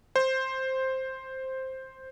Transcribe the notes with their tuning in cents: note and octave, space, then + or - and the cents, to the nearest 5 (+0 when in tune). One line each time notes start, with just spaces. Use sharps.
C5 +5